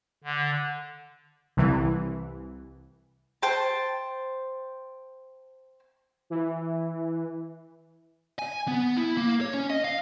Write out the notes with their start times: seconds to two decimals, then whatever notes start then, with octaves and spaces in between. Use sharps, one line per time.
0.24 D3
1.57 C2 E3
3.43 C5 G5 A5
6.30 E3
8.39 G#5
8.68 B3
8.97 E4
9.17 A#3
9.41 C#5
9.54 C#4
9.70 D#5
9.85 F5